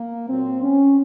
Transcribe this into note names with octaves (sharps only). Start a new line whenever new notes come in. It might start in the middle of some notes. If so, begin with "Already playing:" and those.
Already playing: A#3
A#2 F#3 C4
C#4